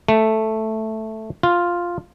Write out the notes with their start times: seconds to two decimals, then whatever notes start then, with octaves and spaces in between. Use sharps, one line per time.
0.09 A3
1.43 F4